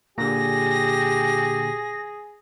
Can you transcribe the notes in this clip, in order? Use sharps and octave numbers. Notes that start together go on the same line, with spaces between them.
A#2 D3 G4 G#4 A#6